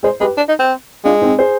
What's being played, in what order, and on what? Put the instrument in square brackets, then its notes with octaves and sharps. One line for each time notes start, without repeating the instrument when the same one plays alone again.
[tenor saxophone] G#3 [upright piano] G#4 C5
[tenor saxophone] G#3 [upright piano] G4 B4
[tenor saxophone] D4
D#4
C4
[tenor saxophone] G#3 [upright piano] D4 F4
[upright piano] C4 D#4
G#4 C5